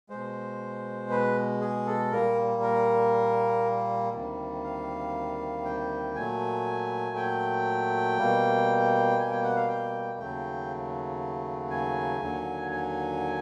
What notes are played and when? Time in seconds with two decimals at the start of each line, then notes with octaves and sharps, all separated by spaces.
0.10 B2 G#3 C5
1.10 B4
1.61 G#4
1.86 A4
2.11 A#2 G3 A#3 A#4
2.62 A#4
4.13 D2 C3 D#3 G3 A#3
4.64 F5
5.65 G5
6.16 A#2 F#3 A3 G#5
7.16 G5
8.17 B2 G3 A#3
9.18 G#5
9.31 G5
9.44 F#5
9.56 F5
9.69 G5
10.19 D#2 C#3 F#3 A3 G5
11.70 G#5
12.21 D#2 D3 F#3
12.71 G#5